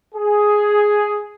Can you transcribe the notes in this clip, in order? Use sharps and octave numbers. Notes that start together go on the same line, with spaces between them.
G#4